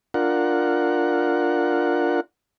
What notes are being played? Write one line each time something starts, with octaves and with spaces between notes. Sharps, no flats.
D4 F4 A#4 F#5